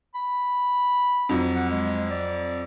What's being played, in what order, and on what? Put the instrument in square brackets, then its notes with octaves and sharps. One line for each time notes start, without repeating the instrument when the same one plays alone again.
[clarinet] B5
[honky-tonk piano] F2 F#3
[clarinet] F#5
G#3
D5